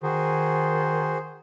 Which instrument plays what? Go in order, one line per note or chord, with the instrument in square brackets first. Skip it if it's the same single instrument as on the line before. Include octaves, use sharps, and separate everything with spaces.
[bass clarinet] D#3 [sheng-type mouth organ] F#4 G#4 C5